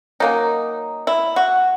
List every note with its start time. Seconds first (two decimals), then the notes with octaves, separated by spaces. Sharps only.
0.20 F#3 A#3 C#4 D#4
1.07 E4
1.36 F#4